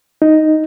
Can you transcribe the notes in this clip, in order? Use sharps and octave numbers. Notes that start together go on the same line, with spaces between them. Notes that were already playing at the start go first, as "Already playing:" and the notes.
D#4